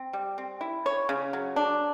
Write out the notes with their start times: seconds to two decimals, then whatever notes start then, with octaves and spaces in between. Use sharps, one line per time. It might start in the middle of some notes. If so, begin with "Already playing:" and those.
Already playing: C4
0.13 G3
0.38 C4
0.61 E4
0.86 C#5
1.09 C#3
1.33 F#3
1.56 D4